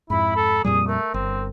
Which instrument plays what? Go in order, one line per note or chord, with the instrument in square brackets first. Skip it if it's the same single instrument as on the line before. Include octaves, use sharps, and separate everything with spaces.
[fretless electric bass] F2 G#2 [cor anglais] E4 [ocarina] B5
[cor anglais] A4
[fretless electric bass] F2 A#2 G3 [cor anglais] G#4 [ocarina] D#6
[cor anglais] A3 [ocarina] A#4
[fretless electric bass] G1 [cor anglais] C4